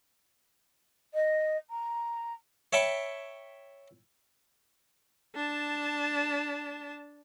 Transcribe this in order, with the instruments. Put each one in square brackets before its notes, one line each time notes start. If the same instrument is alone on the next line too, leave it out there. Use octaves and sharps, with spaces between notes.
[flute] D#5
A#5
[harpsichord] C#5 E5 G5 A5 B5 C#6
[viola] D4 A5